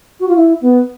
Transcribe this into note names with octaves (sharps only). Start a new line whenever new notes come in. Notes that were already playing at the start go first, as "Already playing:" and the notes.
F#4
F4
E4
B3